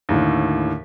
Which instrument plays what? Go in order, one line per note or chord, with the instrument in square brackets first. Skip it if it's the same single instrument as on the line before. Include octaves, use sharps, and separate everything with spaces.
[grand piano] D#2 A2 D3